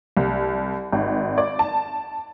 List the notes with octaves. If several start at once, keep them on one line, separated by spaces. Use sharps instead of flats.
C2
G#1
D5
A5